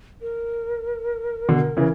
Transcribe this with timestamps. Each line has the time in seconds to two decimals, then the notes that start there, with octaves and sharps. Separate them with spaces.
0.21 A#4
1.49 B2 D3
1.77 C#3 E3